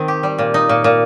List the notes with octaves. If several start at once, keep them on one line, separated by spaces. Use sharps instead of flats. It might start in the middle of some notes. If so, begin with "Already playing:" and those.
Already playing: D#3 C4
G4
G3
A#2
D#4
A#2
A#2